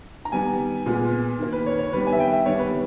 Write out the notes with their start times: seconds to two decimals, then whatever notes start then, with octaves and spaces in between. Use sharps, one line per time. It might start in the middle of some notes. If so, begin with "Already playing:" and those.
0.25 A#5
0.32 D#3 G3 B3 G#5
0.86 A#2 G#3 B3
1.39 D#3 A#3
1.52 B4
1.66 C#5
1.79 C#5
1.92 D#3 G3 B3 B4
2.07 G#5
2.13 E5
2.19 G5
2.32 E5
2.46 D#3 G3 B3 C#5
2.59 B4